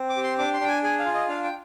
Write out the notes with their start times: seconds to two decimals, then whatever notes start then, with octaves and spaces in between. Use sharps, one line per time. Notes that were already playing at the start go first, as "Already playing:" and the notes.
Already playing: C4
0.09 D6
0.17 G4
0.23 C6
0.39 D4 D6
0.54 C6
0.61 D4 G5
0.68 G#5
0.83 G#4 G#5
0.99 F5
1.06 F4
1.14 D#5
1.29 D4 F5
1.44 G5